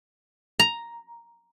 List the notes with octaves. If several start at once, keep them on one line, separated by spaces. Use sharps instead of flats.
A#5